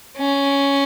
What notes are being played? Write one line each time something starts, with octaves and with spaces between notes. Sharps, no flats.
C#4